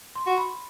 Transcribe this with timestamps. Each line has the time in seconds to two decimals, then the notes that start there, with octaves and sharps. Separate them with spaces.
0.15 C6
0.27 F#4
0.38 B5